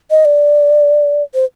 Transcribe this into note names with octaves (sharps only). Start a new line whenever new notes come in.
D#5
D5
C5